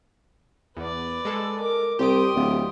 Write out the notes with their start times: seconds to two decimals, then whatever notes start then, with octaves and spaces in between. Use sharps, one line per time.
0.77 E2 B4 D5
1.25 G#3 A4
1.59 A#4 D6
1.99 C2 G4 C6 D#6 D7
2.35 D1